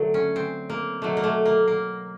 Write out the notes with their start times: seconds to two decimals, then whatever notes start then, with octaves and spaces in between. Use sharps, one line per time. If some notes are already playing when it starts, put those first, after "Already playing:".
Already playing: D3 F#3 A3
0.14 C#4
0.36 C4
0.70 A#3
1.02 B2 F#3 A3
1.17 A#3
1.24 A3
1.46 A#3
1.68 A#3